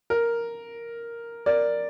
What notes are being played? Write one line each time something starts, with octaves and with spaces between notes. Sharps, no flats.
A#4
A#4 D5